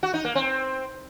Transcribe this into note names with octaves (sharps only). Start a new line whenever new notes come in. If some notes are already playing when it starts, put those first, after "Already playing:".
F#4
D#4
A#3
C4